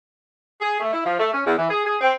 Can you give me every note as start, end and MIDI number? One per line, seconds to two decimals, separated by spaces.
0.61 0.79 68
0.80 0.92 57
0.92 1.01 64
1.05 1.17 53
1.18 1.28 57
1.33 1.42 61
1.45 1.52 40
1.57 1.67 52
1.69 1.84 68
1.85 1.96 68
2.01 2.12 60